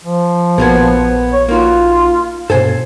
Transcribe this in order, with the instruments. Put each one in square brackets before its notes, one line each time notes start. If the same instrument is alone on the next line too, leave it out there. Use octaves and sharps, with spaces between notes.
[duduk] F3
[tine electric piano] A#1 G#6 [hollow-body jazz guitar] B2 A#3 B3
[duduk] C#5
[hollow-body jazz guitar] A#3 D#4 F#4 [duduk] F4
[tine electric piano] G2 B2 [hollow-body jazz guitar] A4 C5 G#5